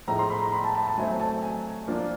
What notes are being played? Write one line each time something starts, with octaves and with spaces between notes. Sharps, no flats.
A2 F3 G#3 A#5
C6
B5
A#5
B5
A5
A5
A5
F#3 A3 C4 G#5
G#5
A5
G#5
F3 A#3 D4 F4